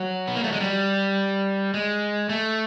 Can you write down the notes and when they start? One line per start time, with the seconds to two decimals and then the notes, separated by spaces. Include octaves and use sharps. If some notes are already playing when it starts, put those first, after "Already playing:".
Already playing: F#3
0.27 B3
0.36 A#3
0.44 A3
0.52 G#3
0.60 G3
1.74 G#3
2.29 A3